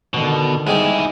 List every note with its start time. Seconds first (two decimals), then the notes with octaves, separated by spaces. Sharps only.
0.14 B2 D3 D#3
0.67 G#2 G3 D#4 E4 G#4